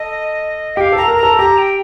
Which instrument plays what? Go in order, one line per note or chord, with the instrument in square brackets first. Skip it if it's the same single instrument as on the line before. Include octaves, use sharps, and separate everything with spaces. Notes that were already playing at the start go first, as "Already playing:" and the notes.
Already playing: [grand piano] A4 [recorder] D#5
[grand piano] G4 [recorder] F5 G5
[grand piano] A4 [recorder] A#5
[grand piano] A#4
[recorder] A#5
[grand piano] A4
[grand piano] G4 [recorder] A#5
[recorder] G5